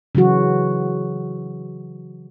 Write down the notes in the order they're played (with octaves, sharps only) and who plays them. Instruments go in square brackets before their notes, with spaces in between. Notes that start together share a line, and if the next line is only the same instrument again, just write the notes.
[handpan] C#3 E3 F#3 F#4